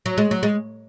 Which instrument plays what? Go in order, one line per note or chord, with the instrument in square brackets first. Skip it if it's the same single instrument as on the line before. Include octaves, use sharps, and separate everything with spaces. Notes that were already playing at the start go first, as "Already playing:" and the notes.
[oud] F#3
G#3
F#3
G#3